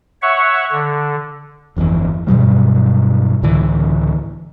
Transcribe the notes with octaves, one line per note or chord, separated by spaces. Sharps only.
C#5 E5 F#5 C#6
D3
G1 F2 B2 E3
G2 B2 F#3 G3
C#2 A2 D3 E3